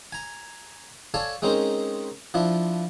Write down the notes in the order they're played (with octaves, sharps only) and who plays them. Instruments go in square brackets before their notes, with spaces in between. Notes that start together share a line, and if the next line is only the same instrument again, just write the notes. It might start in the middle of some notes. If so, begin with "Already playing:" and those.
[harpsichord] G#5 A#5
A4 C#5 D5 F5 G#5 A5
G#3 C4 C#4 D#4 A#4 C5
F3 D4 E4